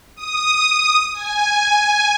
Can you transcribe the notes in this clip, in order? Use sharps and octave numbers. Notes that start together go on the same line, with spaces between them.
D#6
G#5